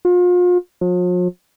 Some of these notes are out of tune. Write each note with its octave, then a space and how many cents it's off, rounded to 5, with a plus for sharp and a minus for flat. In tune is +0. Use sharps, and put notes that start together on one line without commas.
F4 +35
F3 +45